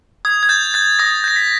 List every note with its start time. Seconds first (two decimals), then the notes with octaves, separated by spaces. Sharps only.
0.25 D#6 G#6
0.43 G#6
0.49 G6 A6
0.74 G6 A6
0.99 D#6 A#6
1.24 G6 A#6
1.36 B6